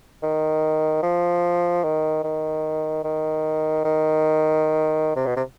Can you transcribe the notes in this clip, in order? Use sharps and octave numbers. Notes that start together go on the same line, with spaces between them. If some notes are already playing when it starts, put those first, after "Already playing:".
D#3
F3
D#3
D#3
D#3
D#3
C3
B2
C3